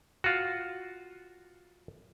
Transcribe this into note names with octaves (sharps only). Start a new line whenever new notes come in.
F4 F#4